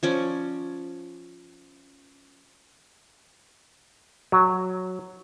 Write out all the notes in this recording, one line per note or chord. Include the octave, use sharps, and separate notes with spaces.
F3 C#4 D5
F#3